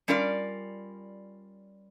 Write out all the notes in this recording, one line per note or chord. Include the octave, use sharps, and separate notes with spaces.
G3 C#4 F4 A#4 D5